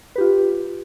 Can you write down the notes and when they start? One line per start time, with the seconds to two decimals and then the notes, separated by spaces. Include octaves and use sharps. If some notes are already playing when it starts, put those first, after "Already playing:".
0.16 B4
0.18 G4
0.21 F4